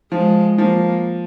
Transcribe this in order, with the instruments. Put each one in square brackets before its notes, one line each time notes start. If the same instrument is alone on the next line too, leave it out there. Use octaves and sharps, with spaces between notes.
[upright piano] F3 [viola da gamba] G#3
[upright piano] F3 [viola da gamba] A#3